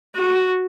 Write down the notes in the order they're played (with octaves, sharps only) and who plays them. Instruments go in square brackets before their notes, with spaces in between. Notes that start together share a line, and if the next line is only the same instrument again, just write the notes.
[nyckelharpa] F#4